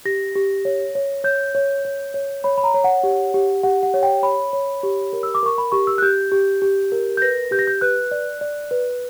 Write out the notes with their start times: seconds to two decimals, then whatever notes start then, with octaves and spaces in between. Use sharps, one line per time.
0.05 G4 A#6
0.35 G4
0.65 C#5
0.95 C#5
1.24 C#5 G6
1.55 C#5
1.85 C#5
2.14 C#5
2.44 C#5 B5
2.58 B5
2.64 A#5
2.74 C#5
2.84 F#5
3.03 G4
3.34 G4
3.63 G4 F#5
3.83 F#5
3.94 C#5
4.03 G5
4.23 C#5 B5
4.53 C#5
4.83 G4
5.13 A#4
5.23 E6
5.35 D6
5.43 A#4 C#6
5.58 B5
5.72 G4 C#6
5.87 E6
5.98 F#6
6.02 G4 G6
6.32 G4
6.62 G4
6.92 A#4
7.17 G6
7.22 B4 A#6
7.51 G4 G6
7.59 A#6
7.67 G6
7.81 B4 F#6
8.11 D5
8.41 D5
8.71 B4